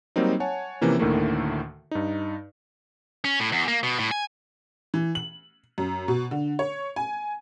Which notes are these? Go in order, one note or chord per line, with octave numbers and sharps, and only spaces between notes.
F#3 G3 A#3 C4 D#4
C#5 F#5 G#5 A5
C3 E3 F3 A#3 C#4
D2 A2 D3 D#3 A3 A#3
G2 D#4
C#4
A2
E2
A#3
B2
A2
G#5
E3
F#7
F#2
B2
D3
C#5
G#5